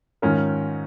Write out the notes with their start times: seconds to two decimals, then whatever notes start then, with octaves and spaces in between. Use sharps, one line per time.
0.22 G#2 D#3 C#4 F4 A#4